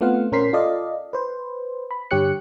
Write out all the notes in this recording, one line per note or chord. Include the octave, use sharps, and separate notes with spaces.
A3 B3 C4 F4 F5 F#5
A#2 C#4 A#4 C5 B6 C7
F4 A4 D5 D#5 F5
B4 C5
B5
G2 D3 G4 C#5 F#6 C#7